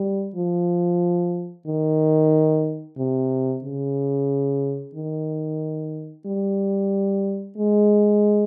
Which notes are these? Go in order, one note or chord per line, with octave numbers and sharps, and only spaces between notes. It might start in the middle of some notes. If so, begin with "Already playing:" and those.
Already playing: G3
F3
D#3
C3
C#3
D#3
G3
G#3